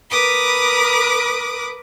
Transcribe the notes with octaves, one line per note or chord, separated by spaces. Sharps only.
A#4 B4 B5 D6 D#6